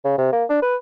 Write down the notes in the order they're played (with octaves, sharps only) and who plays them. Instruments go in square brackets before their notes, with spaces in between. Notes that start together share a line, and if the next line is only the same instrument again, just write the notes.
[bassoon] C#3
C3
A#3
D4
B4